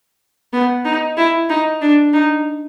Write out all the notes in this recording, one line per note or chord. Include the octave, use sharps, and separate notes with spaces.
B3
D#4
E4
D#4
D4
D#4